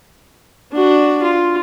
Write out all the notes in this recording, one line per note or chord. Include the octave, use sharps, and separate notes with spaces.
D4 F#4
F4